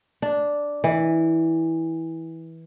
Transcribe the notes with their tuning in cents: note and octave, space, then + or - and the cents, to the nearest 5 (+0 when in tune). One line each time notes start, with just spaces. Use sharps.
D4 -5
E3 -15